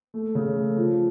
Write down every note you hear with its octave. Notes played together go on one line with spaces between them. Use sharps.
A3
C#3
A3
F3